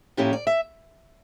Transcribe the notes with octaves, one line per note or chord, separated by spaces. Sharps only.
A2 F3 A#3 C#4 E4 G4
D5
E5